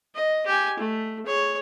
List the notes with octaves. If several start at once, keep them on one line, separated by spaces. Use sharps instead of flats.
D#5
G4 G#5
A3
G#4 C#5